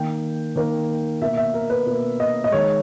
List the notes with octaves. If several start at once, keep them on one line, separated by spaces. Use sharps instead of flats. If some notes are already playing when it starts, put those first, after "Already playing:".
Already playing: D#3 A#3 G5
D#3 A#3
B2 A#3 E5
E5
A#4
B4
B2 A#3
D#5
D#5
D#3 G#3 C#5